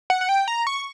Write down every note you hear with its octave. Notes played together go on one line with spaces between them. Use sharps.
F#5
F#5
G5
A#5
C#6